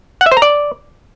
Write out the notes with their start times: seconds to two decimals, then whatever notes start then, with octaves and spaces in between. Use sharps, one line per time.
0.21 F#5
0.26 E5
0.31 C5
0.37 A#5
0.42 D5